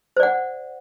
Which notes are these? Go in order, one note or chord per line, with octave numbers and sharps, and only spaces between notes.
C5 D5 F#5